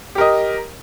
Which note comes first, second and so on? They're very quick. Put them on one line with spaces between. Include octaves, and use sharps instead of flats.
G4 A#4 D#5